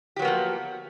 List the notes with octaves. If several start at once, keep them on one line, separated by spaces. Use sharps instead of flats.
F3 F#3 A#3 B3 G4